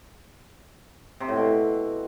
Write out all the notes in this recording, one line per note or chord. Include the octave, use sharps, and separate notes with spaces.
C3
A2
B2